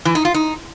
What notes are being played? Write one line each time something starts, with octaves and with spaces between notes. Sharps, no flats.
E3
D#4
F4
D#4